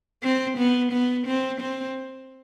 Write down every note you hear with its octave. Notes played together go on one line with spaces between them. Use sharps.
C4
B3
B3
C4
C4